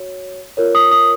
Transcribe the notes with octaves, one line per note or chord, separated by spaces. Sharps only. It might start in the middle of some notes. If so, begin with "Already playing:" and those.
Already playing: F#4 C#5
F4 A#4 C#5
D#6
D#6